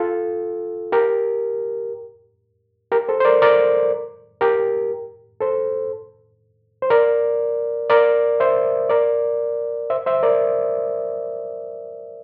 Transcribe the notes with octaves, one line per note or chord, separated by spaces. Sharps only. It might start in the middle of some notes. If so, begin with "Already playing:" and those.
Already playing: F4 A4
G4 A#4
G4 A#4
A4 C5
C5
A#4 D5
A#4 D5
G4 A#4
A4 C5
C5
A#4 D5
A#4 D5
C5 E5
A#4 D5
C5 E5
C5 E5
A#4 D5